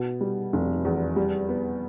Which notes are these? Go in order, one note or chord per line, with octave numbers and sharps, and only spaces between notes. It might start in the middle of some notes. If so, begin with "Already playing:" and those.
Already playing: B2
G3
F1
E2
G3
B3